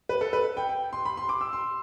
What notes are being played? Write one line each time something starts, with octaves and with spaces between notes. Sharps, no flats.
B4
A4
B4
G5
G5
C6
B5
C6
D6
E6
C6